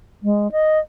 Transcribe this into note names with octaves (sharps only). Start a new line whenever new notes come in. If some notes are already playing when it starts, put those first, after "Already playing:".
G#3
D#5